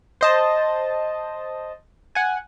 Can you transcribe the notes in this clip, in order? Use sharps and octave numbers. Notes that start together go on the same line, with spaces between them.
C5 D#5 A5
F#5 G#5